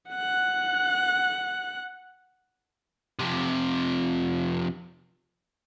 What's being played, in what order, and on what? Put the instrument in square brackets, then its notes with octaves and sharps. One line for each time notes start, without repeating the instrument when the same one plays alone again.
[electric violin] F#5 F#6
[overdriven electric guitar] F2 C3